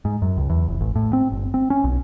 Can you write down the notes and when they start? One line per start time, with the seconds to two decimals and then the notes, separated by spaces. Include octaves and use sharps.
0.05 G#2
0.22 F#2
0.37 C#2
0.50 E2
0.68 F1
0.81 A1
0.96 A2
1.13 C4
1.32 G1
1.54 C4
1.70 C#4
1.84 B1